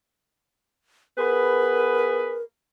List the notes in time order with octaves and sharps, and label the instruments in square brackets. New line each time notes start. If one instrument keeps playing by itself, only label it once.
[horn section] B3 G#4 B4 [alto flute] A#4